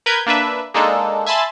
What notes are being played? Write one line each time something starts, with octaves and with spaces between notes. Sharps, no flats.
A#4 B4 G6 G#6
A#3 D4 B4 E5
G#3 A#3 D4 D#4 A4
E5 G#5 A5 B5 C6 A6